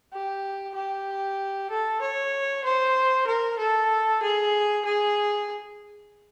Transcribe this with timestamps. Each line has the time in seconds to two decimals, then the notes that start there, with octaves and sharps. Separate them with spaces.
0.13 G4
0.75 G4
1.70 A4
2.02 C#5
2.64 C5
3.27 A#4
3.59 A4
4.23 G#4
4.85 G#4